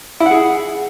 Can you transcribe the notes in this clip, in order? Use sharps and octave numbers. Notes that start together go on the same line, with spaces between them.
E4
F#5
G#4